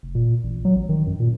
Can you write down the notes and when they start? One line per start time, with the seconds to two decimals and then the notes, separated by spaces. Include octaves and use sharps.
0.03 F1
0.15 A#2
0.44 A1
0.65 F#3
0.76 A1
0.89 D#3
1.06 F#2
1.20 A#2